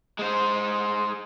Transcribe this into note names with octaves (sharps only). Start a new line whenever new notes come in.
G#3 C5